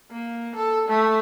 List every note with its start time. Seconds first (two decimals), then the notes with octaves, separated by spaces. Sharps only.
0.11 A#3
0.56 A4
0.89 A3